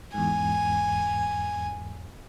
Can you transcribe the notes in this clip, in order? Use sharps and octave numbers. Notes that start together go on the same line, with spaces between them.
E2 G#2 G#5